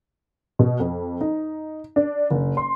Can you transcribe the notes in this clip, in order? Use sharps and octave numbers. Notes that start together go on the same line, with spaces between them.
B2
F2
D#4
D4
F#1
C6